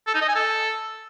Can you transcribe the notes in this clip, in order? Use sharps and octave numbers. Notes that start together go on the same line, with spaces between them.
A4
D#4
D#5
G#5
A4